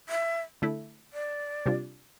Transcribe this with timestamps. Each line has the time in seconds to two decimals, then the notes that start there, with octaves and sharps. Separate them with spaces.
0.09 E5
0.62 D3 A3 E4
1.13 D5
1.66 C3 G3 D4 F4